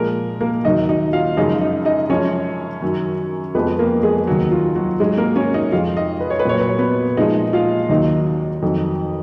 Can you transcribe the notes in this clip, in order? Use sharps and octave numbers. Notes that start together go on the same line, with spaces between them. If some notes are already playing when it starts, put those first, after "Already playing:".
Already playing: A#2 F3 G#3 A#3 A#4
A#3 A#4
D#2 D#3 F#3 D#4 D#5
D#4 D#5
F4 F5
F#2 C#3 F3 G#3 D#4 D#5
D#4 D#5
D#4 D#5
F#2 F3 G#3 C#4 C#5
F#2 D#3 F#3
F2 F3 G#3 B3 B4
A#3 A#4
G#3 G#4
D#2 D#3 F#3 F#4
F4
F#3 F#4
G#2 F#3 G#3 G#4
A#3 A#4
C#4 C#5
D#4 D#5
F2 F3 G#3 F4 F5
D#4 D#5
B4
C#5
B4
A#2 F#3 C#5
B4
C#5
B3 B4
A#2 F3 G#3 D#4 D#5
F4 F5
D#2 D#3 F#3 D#4 D#5
F2 D#3 F#3